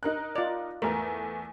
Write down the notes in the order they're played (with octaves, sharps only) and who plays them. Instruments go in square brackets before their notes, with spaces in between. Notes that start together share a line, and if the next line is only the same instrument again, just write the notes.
[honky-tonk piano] D#4 A#4 F#6
[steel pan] F4 D5
[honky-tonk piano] E2 A3 [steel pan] A#4